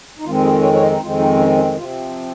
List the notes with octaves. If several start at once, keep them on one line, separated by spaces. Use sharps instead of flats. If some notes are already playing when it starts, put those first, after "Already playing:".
D#4
F2 D#3 G#3 C4 F4
G#4
C#5
C#5
D#5
D#4
F2 D#3 G#3 C4 F4
D#4
C#4
C#4
C3 F3 C4 F4